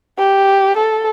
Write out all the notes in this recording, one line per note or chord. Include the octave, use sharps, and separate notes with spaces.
G4
A4